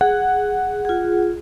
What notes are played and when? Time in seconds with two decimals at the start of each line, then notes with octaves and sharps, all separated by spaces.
0.01 G#4 F#5
0.85 F4 G#4